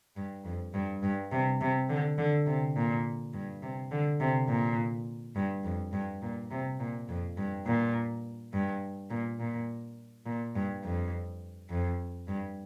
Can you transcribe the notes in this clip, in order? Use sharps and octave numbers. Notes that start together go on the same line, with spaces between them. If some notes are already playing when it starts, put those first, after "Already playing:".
G2
F2
G2
G2
C3
C3
D3
D3
C3
A#2
G2
C3
D3
C3
A#2
G2
F2
G2
A#2
C3
A#2
F2
G2
A#2
G2
A#2
A#2
A#2
G2
F2
F2
G2